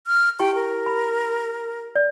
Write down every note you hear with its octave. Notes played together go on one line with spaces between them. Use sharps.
F6
E4 G4 G5 C#6
A#4
B5
D5